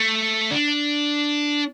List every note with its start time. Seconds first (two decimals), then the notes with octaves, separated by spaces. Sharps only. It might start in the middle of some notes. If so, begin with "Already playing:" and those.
Already playing: A3
0.51 D4